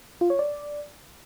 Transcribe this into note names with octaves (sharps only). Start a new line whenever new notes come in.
F4
C#5
D5